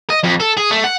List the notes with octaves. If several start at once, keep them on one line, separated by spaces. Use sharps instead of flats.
D#5
F2
A4
G#4
A3
F#5